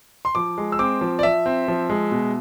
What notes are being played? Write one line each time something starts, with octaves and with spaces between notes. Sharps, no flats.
C6
F3 D6
G#3
E6
C4 D6
F3
D5
F3 E5
C4
F3
G#3
B2